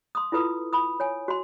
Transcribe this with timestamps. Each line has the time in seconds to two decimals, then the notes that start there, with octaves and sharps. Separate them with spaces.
0.15 C6 D#6
0.32 E4 F4 A4 B4 D#6
0.73 B5 D#6
1.00 C#5 G#5
1.28 F#4 C6